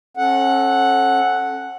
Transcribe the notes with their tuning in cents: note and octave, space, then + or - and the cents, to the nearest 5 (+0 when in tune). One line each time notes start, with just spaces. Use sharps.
C#4 -40 A4 -10 F#5 +0